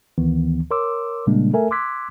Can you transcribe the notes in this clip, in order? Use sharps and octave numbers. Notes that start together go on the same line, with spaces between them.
D2 D#3 E3 B3
A#4 C#5 C6 D6 E6
A#2 C#3 G3 G#3 A#3 D4
A3 A4 A#4 E5 G#5
C6 D6 E6 F#6 G#6 B6